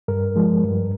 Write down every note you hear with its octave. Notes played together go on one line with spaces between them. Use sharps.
G2 A#4
F3 G#3
G2